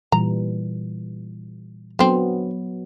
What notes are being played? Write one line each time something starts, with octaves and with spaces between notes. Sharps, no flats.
A#2 E3 G3 A#5
D3 F#3 B3 C4